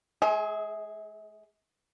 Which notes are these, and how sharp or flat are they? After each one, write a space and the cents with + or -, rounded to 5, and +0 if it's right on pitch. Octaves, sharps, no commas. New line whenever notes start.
G#3 +45 G#4 +0 E5 -45